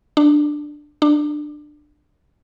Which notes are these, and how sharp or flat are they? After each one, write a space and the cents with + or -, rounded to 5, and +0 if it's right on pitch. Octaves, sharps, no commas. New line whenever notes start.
D4 +10
D4 +20